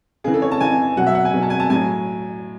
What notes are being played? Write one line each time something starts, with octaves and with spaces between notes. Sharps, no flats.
C#3 E3 G#4
A4
C#5
A5
C#3 E3 G#5
B2 F#3 F#5
E5
F#5
G#5
B2 F#3
A5
G#5
A5
A2 F#3 G#5